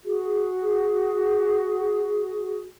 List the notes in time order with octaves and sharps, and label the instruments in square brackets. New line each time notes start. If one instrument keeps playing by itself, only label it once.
[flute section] F#4 G#4